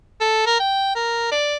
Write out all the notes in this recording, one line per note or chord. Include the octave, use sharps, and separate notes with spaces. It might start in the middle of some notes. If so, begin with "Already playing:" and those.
A4
A#4
G5
A#4
D5